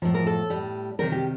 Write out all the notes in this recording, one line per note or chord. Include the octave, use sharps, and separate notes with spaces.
A2 F3 A#4
A#4
A4
A2 G3
C3 D#3 G3 A#4
G4